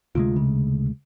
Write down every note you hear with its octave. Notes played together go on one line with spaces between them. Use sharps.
D2 C3 G#3 F4
C#3